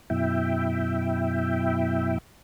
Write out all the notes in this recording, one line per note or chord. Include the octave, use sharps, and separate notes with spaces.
F#2 B2 E4 E5 G5